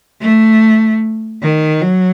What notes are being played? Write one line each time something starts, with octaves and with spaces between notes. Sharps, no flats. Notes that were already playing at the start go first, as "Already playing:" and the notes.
A3
D#3
F#3